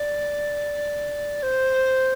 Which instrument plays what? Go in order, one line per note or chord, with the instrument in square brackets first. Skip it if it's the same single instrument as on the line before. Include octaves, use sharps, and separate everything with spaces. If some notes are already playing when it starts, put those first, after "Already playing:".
Already playing: [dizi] D5
C5